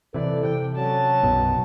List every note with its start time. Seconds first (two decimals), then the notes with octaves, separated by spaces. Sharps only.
0.14 C3 E3 A4 D5
0.43 C3 G5
0.76 F#3 C#4 A5
1.23 B1 F#2 B2